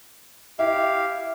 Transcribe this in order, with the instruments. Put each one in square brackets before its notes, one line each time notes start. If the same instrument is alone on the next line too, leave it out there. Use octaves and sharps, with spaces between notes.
[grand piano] E4 [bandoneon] G4 F5